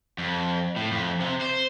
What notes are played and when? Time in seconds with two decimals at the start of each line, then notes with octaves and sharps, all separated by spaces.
0.18 F2
0.76 A2
0.91 F2
1.20 C3
1.42 C5